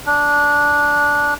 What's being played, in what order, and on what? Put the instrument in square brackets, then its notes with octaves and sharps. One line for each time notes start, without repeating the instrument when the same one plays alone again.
[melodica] D4